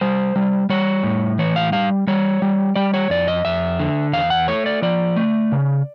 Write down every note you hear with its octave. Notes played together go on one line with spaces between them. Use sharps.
G3 C5
G3
G3 C#5
A2
E3 C#5
F5
G3 F5
G3 C#5
G3
G3 D5
C#5
F2 D5
D#5
F2 E5
D3
E2 F5
F#5
A3 C#5
D5
F3 D5
A3
C#3